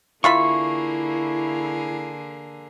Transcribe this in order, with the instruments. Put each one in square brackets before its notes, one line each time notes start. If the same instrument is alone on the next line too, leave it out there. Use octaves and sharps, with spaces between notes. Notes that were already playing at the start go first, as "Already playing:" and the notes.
[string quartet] D3 A#3 G#4 [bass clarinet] E4 [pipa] F4 E5 B5 [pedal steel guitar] C#6